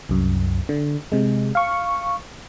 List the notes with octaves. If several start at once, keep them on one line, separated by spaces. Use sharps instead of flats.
C2 F#2
D3
C3 G#3
F5 C#6